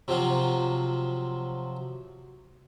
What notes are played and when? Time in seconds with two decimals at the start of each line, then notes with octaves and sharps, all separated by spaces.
0.08 C3 F3 F#3 F4